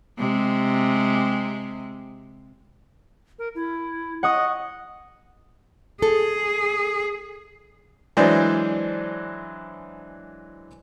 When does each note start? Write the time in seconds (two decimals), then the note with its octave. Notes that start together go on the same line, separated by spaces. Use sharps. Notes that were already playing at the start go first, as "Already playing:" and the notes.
0.18 C3 G#3
3.39 A#4
3.55 E4
4.23 D#5 F#5 C#6 D#6
6.02 G#4 A4
8.17 E3 F#3 G#3 D4 C5 D5